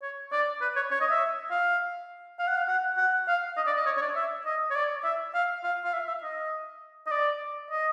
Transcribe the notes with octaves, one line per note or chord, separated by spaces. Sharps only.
C#5
D5
B4
C#5
C#5
D#5
E5
F5
F5
F#5
F5
F#5
F#5
F5
D#5
D5
D#5
C#5
C#5
D5
E5
D#5
C#5
D5
E5
F5
F5
F5
E5
E5
D#5
D#5
D5
D#5